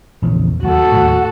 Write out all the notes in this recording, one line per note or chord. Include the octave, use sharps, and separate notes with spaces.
A#1 E2 C#3
D#2 F#3 A#3 F#4 A4
D#2 A2